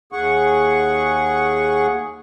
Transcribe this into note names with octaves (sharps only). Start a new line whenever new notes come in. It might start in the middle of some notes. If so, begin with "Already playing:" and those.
D#2 G#4 F#5 C#6